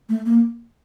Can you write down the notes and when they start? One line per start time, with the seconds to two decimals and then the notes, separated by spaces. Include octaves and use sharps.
0.09 A3
0.26 A#3